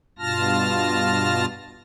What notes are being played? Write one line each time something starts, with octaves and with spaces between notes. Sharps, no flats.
G2 B2 F4 A5 F6 A#6